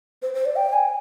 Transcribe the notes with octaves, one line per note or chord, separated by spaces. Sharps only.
C5
C5
D5
G5
G#5